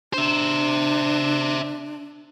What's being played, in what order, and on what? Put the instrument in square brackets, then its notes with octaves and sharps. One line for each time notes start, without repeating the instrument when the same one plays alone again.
[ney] D4 [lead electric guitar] C5 E5